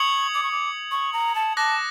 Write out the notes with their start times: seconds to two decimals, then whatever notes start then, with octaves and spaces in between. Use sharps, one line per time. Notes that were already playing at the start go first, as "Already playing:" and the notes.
Already playing: C#6 D#6 G#6 C#7 F#7
0.34 D6
0.43 C#6
0.51 D6
0.91 C#6
1.13 A#5
1.35 A5
1.57 A5 D6 F#6 A#6